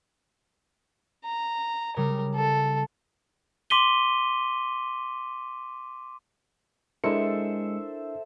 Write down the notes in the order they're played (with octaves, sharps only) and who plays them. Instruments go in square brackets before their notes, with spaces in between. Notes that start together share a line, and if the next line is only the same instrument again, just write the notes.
[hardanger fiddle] A#5
[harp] C#3 G3 [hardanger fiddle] A#4
[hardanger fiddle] A4
[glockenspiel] C6 D6 B6 D#7 G7
[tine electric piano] G#3 C#7 [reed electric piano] D4 E4 A#4 [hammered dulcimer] A4 C5 E5